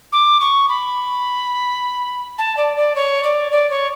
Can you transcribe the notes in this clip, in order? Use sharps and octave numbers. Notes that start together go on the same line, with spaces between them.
D6
C#6
B5
A5
D5
D5
C#5
D5
D5
C#5